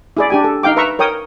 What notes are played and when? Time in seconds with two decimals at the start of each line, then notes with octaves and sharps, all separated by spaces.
0.17 E4 G#4 D5
0.30 D4 G4 G#5
0.44 A4
0.63 D#4 F5 G5 D6
0.77 B4 E5 A#5 C#6
0.99 A#4 C#5 G5 D#6